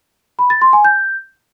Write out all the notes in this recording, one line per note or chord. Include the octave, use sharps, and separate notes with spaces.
B5
A6
C6
G#5
G6